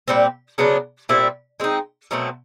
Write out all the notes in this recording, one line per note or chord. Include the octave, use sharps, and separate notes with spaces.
A#2 G3 C4
C#3 F#3 B3 D4
A#2 G3 C4 E4
G#3 C4 D#4
B2 F#3 A3 C4